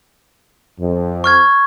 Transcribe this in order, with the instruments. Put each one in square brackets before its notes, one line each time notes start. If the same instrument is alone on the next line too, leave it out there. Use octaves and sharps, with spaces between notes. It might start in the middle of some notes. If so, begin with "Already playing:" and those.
[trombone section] F2
[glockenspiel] C#6 F6 G#6